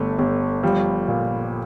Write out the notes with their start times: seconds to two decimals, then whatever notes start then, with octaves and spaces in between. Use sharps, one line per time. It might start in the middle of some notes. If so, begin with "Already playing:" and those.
Already playing: G1 A3
0.19 G1
0.63 F3 G3
1.08 A#2